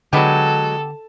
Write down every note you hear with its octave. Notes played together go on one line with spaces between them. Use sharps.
D3 F#3 G#3 B3 G4 A4